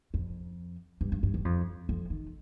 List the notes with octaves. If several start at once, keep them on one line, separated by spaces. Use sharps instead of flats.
F2
G2
G2
G2
G2
F2
F2
D#3